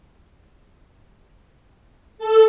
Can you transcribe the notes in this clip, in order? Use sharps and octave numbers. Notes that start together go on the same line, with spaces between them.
A4